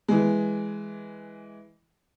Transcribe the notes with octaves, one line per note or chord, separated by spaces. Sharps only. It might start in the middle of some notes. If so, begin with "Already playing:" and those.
E3 G#3